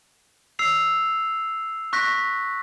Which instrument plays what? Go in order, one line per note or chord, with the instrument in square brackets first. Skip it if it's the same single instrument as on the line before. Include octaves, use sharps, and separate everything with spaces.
[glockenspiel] E6 C7 F7
C#6 F#6 A#6 B6